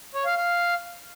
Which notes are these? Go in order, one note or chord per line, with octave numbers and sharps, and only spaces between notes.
C#5
F5
F5